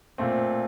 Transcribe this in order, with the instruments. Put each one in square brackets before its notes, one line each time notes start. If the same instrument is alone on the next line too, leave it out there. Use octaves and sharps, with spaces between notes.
[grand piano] A#2 A3 C4